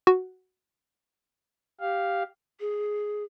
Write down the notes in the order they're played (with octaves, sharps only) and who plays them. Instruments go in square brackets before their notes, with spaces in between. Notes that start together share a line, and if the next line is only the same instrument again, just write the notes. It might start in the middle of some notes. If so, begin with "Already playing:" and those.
[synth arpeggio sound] F#4
[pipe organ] G4 F5
[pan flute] G#4